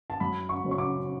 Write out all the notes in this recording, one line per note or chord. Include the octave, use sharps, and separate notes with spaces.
A5
F#2 B5
C#6
C#3 F#3 C#4
C#6
D6